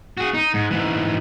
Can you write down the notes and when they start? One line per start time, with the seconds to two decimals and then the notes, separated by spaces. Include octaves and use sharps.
0.17 F#4 G#4
0.34 D#4
0.54 G#2
0.71 G#2 E3